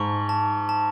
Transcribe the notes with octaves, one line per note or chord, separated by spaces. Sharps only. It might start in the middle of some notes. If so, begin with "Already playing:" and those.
Already playing: G#2 A5 C#6
A5
A5